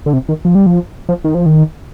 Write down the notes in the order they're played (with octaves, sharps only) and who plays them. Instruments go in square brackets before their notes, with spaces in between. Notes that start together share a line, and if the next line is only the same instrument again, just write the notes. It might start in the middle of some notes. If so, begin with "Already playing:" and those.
[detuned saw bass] D3
C3
D#3
F3
G3
F3
F3
D#3
F3
D#3